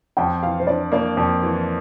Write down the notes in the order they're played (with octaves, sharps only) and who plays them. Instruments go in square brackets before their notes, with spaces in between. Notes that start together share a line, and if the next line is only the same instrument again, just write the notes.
[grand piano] F2 [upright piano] G5
[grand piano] E3 [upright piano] F5
[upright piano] C5
[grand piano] D4 [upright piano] D5
[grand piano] A#3 [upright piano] D5
[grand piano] F2
E3